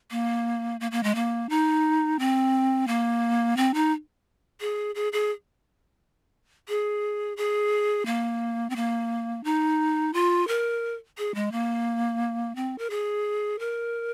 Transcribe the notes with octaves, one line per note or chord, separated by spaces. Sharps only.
A#3
A#3
A#3
G#3
A#3
D#4
C4
A#3
C4
D#4
G#4
G#4
G#4
G#4
G#4
A#3
C4
A#3
D#4
F4
A#4
G#4
G#3
A#3
C4
A#4
G#4
A#4